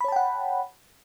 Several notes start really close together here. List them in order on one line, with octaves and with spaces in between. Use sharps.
B5 C#5 A5 G5 F#5